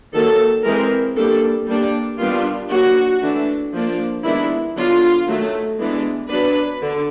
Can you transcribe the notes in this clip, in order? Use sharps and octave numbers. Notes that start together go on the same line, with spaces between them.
D#3 F#3 A#3 A4
E3 G#3 C4 A#4
G3 A#3 D4 A4
G3 A#3 D4
D#3 G3 B3 D4 F4
F#3 A#3 D4 F#4
E3 A3 D4
F3 A#3 D4
D#3 G#3 B3 D4 E4
D3 F#3 B3 D4 F4
D#3 F#3 A3
E3 G#3 B3 D4
F#3 B3 D4 B4
D3